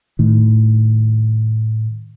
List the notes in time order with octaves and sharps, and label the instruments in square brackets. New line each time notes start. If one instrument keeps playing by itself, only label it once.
[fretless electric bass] A2 D#3